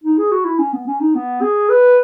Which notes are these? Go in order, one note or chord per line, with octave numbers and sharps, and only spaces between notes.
D#4
G#4
F#4
E4
C#4
B3
C#4
D#4
B3
G#4
B4